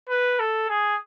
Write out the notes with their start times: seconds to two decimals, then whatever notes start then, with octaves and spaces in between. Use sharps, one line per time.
0.09 B4
0.40 A4
0.69 G#4